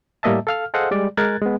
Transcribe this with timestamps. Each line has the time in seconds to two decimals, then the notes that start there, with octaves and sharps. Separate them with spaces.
0.23 A2 G3 A#3 D#5 E5 A5
0.47 A4 F5 F6
0.74 G#4 A4 C5 D#5 F5 F#5
0.91 G3 G#3 D5
1.17 G#3 A#4 F#6 G#6 A6
1.41 G#3 B3